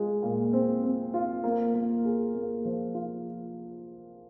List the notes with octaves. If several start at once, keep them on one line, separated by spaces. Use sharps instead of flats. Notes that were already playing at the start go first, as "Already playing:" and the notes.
Already playing: G#3 F4
A#2
C4
C4
F4
A#3
A#3
G#4
A#3
F3
F4